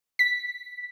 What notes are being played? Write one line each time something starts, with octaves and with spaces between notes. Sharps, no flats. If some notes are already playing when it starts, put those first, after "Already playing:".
B6